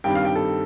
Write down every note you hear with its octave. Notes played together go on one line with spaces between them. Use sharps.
G2 D#3 G3 C4 G5
F5
G5
A4